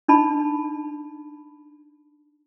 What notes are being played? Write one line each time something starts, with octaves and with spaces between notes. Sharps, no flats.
D4 D#4 A5 B5